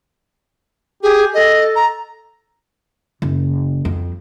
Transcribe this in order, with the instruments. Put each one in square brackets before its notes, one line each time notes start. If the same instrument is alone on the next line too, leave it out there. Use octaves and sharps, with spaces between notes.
[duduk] G4 [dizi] G#4
[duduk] A4 [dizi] D#5
[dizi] A#5
[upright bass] F#1
F2